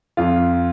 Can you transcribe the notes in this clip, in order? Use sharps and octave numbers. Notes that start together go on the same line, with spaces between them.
F2 F4